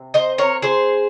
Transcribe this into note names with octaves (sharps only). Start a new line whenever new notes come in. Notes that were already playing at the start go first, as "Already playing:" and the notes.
Already playing: C3 C4
C5 D#5
A#4 C#5
G#4 C5